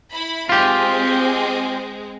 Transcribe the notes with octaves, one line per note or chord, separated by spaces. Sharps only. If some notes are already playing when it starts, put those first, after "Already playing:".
E4 B5
G#3 C4 F4 G4